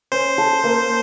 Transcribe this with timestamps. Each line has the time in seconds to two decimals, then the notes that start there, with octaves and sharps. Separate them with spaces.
0.12 C#4 C5
0.38 A4
0.64 A#3